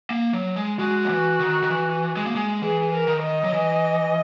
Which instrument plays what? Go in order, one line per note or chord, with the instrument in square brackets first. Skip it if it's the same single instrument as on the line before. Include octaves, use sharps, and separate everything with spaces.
[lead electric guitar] A#3
F#3
G#3
[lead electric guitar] G#3 [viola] F#4
[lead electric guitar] F#3
E3
D#3
D#3
E3
G#3
A#3
G#3
[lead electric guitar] E3 [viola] G#4
[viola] A#4
[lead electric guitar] D#3
[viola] D#5
[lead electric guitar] F#3
E3